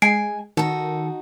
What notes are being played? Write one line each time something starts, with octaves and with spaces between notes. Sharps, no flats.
G#3 G#5 C7 D7
D#3 D#4 F#4 A4